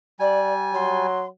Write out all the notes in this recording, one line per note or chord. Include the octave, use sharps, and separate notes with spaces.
G3 D5 G#5
F#3 C6